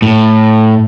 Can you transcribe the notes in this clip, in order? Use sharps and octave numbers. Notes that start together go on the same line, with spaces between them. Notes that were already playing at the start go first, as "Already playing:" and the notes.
A2